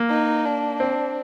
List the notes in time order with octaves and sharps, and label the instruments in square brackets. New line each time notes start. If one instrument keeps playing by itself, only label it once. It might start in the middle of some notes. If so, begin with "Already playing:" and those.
Already playing: [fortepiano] A#3
[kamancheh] D#4
D4
[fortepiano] C4